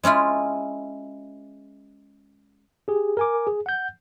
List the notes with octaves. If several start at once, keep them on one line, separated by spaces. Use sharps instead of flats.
G#3 C#4 E4 F4
G4 G#4
A#4 G#5 D6
G#4
F#5 G6